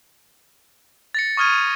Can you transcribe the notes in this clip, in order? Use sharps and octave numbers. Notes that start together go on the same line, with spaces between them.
A6 A#6 C#7
C#6 D#6 F6 G#6 D#7